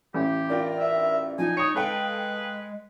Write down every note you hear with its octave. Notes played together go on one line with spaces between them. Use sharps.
A1 G4
D4 F4 A#4 G5
E5
F3 D#4 G#5
C#5 D#6 C#7
G#3 A4 B4 F5 G5